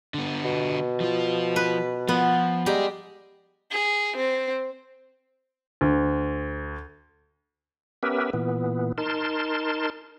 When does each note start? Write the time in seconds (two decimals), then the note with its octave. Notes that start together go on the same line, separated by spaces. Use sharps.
0.14 D3 B3
0.45 B2
1.00 F3 F4
1.56 B4
2.09 F3 B3
2.66 G3 G4 G#4 D#5 A#5
3.71 G#4
4.17 C4
5.81 D2
8.03 B3 C#4 G4 A#4 B4 E5
8.33 A#2 E3 B3
8.98 D#4 A#4 A5 C6